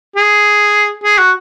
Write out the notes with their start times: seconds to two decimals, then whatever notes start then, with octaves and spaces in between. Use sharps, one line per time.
0.16 G#4
1.04 G#4
1.19 F#4